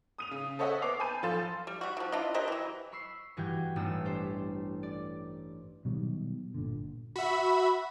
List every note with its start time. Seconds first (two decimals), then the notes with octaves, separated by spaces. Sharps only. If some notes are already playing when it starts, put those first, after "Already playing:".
0.18 D#6 D#7 F7
0.31 C#3
0.59 A4 C5 C#5 D#5 E5 F#5
0.82 B3 D6 C7 F7
1.00 G#5 A5 B5 G6 D#7
1.23 F3 A4 F5 C6 A6 E7
1.67 G3
1.81 G3 F#4
1.97 D#3 F3
2.12 D4 E4 F4 D#5
2.34 G4 A#4 C5 D#5
2.48 E3 F#3
2.92 B5 C#6 E6 C7
3.37 G2 E3 F#4 G4 G5 G#6
3.76 A1 G2 A3 B3 E6
4.05 D4 G4 C5 E5
4.83 D5
5.85 B2 D#3 F#3 G3
6.54 G1 A#2 D3
7.16 F#4 E5 B5